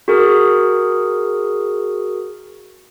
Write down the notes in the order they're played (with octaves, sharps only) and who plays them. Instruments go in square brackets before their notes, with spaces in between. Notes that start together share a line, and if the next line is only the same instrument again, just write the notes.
[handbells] F#4 G#4 A#4